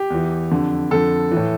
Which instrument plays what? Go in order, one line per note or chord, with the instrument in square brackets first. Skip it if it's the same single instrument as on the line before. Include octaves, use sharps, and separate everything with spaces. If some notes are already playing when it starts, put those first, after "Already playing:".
Already playing: [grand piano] G4
E2 E3
F2 D3
F2 D3 A4
E3
A2